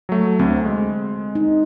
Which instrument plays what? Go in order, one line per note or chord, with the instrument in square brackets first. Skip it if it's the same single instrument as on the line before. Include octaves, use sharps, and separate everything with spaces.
[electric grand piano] F#3 A3
[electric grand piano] D2 [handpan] C4
[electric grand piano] G#3
[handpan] D#4